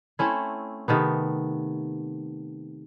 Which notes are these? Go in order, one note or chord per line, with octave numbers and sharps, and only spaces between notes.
A3 C4 C#4 E4
C3 D#3 A3 B3